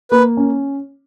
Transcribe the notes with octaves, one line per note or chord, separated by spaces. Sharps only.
A#3 B4
C#4